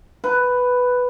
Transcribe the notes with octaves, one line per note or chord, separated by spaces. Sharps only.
B4